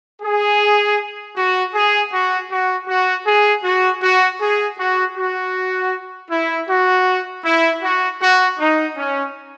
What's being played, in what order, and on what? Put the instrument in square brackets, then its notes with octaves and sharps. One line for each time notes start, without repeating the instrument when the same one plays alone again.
[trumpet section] G#4
F#4
G#4
F#4
F#4
F#4
G#4
F#4
F#4
G#4
F#4
F#4
E4
F#4
E4
F#4
F#4
D#4
C#4